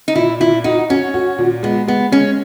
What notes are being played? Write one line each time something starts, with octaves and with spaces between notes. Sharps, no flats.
D#4
A#2 E4
A#2 E4
D#4 F#4
C#4 F#4
F#4
A#2
G#3 B3
G#3 B3
G#3 C#4